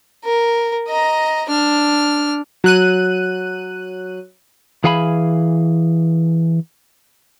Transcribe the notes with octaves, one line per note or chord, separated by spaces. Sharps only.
A#4
D#5 A#5
D4 F6
F#3 F#6 D#7
E3 G#4 F5 G#5 B5